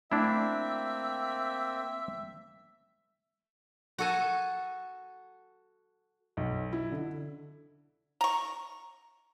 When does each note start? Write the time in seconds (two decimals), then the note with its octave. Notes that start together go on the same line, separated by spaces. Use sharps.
0.12 A3 A#3 C4 D4 E4 E5
3.98 F#4 A4 G#5
6.37 B1
6.73 E4
6.92 D3
8.21 A#5 C#6